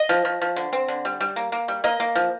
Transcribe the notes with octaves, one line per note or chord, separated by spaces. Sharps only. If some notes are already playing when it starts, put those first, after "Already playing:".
Already playing: D#5
F3
F3
F3
D3
C4
D3
G3
G3
A#3
A#3
G3
A#3 D#5
A#3
F3